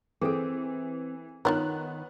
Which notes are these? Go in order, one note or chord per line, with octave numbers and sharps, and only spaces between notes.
E3 C4 G#4 A4
D#3 B3 D#4 F4 A#4 C#5 F#6